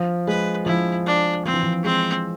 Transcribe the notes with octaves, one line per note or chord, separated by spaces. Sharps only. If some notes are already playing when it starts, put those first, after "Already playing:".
Already playing: F3
G#3 B4
F3 E4
D4
F3 C4
E3
F3
G#3 C4